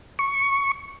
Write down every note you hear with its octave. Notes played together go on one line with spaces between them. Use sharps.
C#6